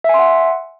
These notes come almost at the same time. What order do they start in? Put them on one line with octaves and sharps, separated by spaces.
E5 G#5 C6 F#5